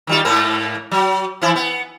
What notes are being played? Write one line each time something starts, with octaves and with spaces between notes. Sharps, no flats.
D#3 G3 F4
G#2 A#3 A#4
F#3
E3 F3 E4
B3